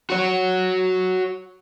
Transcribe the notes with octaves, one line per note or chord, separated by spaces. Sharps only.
F#4 C#5